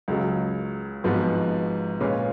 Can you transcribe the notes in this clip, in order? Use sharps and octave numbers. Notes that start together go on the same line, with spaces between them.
C#2 C#3 F#3
G#1 G#2 F3 B3 F#4
A#2 G#3 C#4 F4 B4